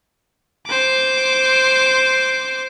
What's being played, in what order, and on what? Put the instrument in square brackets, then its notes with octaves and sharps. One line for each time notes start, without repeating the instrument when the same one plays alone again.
[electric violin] C5 D6